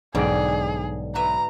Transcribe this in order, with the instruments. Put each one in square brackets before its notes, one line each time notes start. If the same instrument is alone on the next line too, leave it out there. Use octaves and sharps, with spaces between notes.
[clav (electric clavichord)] B1 D5 [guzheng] G#2 D3 G3 [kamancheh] G#4
[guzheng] F#4 B4 E5 [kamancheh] A#5